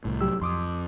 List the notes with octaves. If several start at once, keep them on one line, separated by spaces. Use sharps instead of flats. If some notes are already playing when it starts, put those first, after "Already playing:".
C2 A2
F#3 G4 E6
F2 C6 D6 D#6